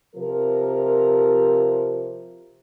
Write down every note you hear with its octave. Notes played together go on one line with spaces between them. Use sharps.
C3 F3 A#4